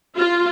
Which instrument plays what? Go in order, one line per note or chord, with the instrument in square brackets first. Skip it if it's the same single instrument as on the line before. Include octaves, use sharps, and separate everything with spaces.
[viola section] F4